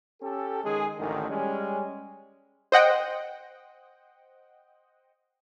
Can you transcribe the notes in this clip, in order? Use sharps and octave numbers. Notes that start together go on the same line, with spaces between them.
C#4 G4 A4
D#3 G#3 G#4
A1 D3 D#3
G3 G#3 C#4
C5 D#5 F#5 G5